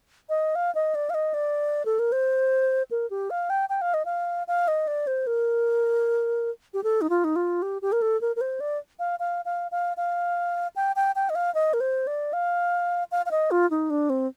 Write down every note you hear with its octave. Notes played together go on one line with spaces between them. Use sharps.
D#5
F5
D#5
D5
F5
D#5
D5
A4
A#4
C5
A#4
G4
F5
G5
G5
F5
D#5
F5
F5
D#5
D5
C5
A#4
G4
A4
D#4
F4
D#4
F4
G4
G4
A#4
A4
A#4
A#4
C5
D5
F5
F5
F5
F5
F5
G5
G5
G5
D#5
F5
D#5
A#4
C5
D5
F5
F5
F5
D#5
F4
D#4
D4
C4